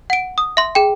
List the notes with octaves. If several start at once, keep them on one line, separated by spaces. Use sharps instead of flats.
F#5 D7
D#6
E5 C6
G#4 G5